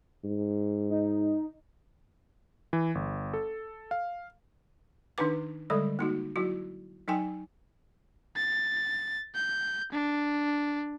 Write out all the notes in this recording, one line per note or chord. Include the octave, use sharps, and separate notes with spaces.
G#2
D#4
E3
G1
A4
F5
D#3 D4 D#4 B4 D6
D3 G3 G#3 A4 D5
A#3 D#4 F#4
F#3 E4 F#4
F#3 D#4 G5 G#5
A6
G6
D4